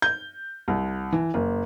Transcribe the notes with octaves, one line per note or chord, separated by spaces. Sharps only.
G6
C2
E3
F#1